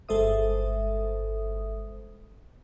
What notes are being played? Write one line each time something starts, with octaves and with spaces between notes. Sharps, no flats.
G1 G#3 A4 C5 E5 D#6